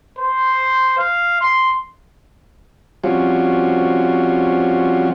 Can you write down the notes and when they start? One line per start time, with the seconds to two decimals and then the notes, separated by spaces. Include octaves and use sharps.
0.18 C5
0.98 F5
1.41 C6
3.04 F3 G3 C4 C#4 F4 F#4